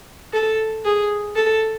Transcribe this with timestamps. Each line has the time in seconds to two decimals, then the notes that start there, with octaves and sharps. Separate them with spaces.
0.33 A4
0.85 G#4
1.36 A4